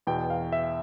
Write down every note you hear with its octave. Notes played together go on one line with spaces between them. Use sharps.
E2 B2 G5
F5
E5